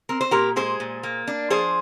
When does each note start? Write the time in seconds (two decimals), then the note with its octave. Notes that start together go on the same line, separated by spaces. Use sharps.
0.09 C4 A#4
0.21 C5
0.31 A#2 G4 A#4
0.56 G#3 G#4 C5
0.80 A#2
1.03 A#3
1.28 D4
1.50 F3 G#4 C5